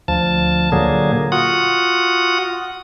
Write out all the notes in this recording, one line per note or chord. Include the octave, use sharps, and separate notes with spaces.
D2 F3 A5
A#2 D3 F#3 A#3 G#4
F4 F#4 F#5 D#6